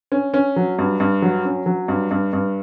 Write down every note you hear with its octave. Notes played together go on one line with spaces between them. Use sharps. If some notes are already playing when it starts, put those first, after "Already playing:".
C#4
C#4
F#3
G2
G2
F#3
C#4
F#3
G2
G2
G2